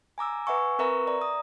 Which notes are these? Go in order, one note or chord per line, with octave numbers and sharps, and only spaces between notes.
G#5 A#5 D6 E6
B4 E5 F#5 G#5 C#6 E6
C4 A#4 B4 E5 A#5 C#6
D5 E5 A#5
D#6